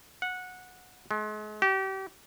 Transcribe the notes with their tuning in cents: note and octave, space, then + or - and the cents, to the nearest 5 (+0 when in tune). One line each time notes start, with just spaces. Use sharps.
F#5 -15
G#3 +40
G4 -35